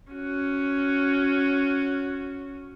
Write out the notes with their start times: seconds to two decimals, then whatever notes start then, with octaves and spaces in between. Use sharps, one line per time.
0.12 C#4 F#4